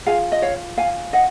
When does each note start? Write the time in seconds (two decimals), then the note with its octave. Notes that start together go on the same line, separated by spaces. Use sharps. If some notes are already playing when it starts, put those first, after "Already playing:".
0.06 F4 G#4 F5 G#5
0.32 D#5
0.42 C#5 F5
0.78 F5 G#5
1.13 D#5 F#5